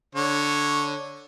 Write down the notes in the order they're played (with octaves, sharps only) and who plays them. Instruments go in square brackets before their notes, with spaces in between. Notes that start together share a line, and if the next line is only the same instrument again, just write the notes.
[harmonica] D3 C#5